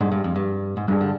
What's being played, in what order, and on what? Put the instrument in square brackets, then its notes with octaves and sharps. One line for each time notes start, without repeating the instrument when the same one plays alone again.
[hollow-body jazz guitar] G#2 [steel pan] G3 D4 G#4
[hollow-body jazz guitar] G2
F2
G2
G#2
[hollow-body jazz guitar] G2 [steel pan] G3 D4 G#4
[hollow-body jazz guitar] D3